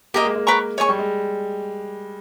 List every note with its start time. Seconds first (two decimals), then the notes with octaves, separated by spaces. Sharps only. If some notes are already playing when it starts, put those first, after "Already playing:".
0.14 A#3 G4 A#4 D#5
0.25 G#3
0.36 G#3
0.47 B4 G5 A#5 C#6
0.78 G#3 C#5 G#5 C#6
0.89 G3
0.99 G#3